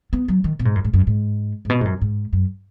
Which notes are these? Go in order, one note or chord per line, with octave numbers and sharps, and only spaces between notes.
B3
F#3
D#3
B2
G#2
F#2
G#2
F#2
G#2
G#2
B2
G#2
F#2
G#2
F#2